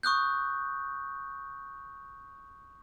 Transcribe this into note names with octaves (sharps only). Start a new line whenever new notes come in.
C#6 D#6 F#6 G6